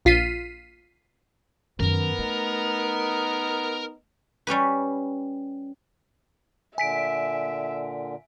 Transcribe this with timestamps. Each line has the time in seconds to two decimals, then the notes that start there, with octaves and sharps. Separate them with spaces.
0.05 A#1 F4 B6 C7 D#7
1.80 F#2 D#3 B3 A#4
2.19 A3 D#4
4.47 G3 C#4 G4 B4
6.78 A#2 D3 E5 G#5 B6 D7